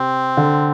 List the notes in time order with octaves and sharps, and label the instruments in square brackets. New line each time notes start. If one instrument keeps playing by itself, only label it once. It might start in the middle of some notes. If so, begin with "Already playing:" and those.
Already playing: [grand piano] C3 [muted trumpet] C4
[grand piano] D3